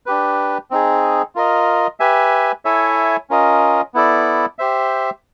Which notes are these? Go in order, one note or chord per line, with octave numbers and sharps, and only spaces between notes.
D4 G4 B4
C4 D#4 G#4
F4 A#4 D#5
G4 B4 E5 G#5
E4 A4 C#5 E5 G#5
C#4 F4 A#4 D#5
B3 E4 A4 D5
G4 C5 E5